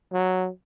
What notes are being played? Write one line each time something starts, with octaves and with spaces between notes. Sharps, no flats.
F#3